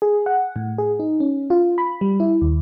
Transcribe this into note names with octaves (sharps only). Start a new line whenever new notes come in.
G#4
F#5
A2
G#4
D#4
C#4
F4
B5
G3
E4
D#2